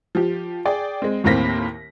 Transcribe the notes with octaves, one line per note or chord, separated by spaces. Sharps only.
F3 G4
G#4 D5 G5
G#3 C4
D#2 A2 A#3 C4 A#6 B6